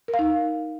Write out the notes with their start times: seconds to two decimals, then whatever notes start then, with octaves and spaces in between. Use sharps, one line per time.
0.08 A#4
0.14 F5
0.19 D#4